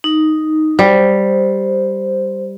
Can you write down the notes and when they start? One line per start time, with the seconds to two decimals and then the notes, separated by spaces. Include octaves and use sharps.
0.04 D#4
0.79 G3 C5